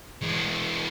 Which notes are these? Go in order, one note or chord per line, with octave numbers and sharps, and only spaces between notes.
E3 G#3